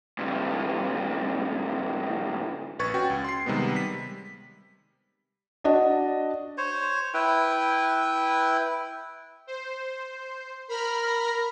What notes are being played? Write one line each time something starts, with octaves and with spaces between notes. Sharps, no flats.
C#2 G2
A#1 B4 C#6 G#6 A6
C#4 F#4 G5
C#2
C6 C7
C3 D#3 G3 G#3 B3
G3 B6
D4 F#4 D#5 A5
C5 C#5
E4 B4 G5
C5
A#4 B5 F6